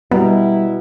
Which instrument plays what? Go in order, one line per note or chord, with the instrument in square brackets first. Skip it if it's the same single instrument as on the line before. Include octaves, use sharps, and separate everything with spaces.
[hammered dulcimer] B2 A#5 [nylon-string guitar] G3 [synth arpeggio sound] B3 [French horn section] E4